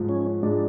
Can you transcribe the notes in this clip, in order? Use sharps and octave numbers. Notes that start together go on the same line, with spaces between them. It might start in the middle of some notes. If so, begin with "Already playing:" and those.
Already playing: G#2 F3 G#3
C#4
G#2 F3 G#3 D4